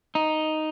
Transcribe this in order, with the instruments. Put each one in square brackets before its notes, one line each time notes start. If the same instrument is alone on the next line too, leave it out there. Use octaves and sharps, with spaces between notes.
[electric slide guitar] D#4